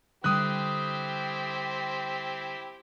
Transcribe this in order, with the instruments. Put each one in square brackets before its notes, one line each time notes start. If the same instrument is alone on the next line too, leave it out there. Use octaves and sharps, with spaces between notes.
[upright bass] D3 G3 [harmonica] C4 E4 G4 [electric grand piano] D#6 F#6